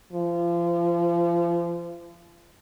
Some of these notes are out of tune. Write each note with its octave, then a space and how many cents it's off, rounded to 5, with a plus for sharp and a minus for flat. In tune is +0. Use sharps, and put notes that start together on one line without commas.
F3 -30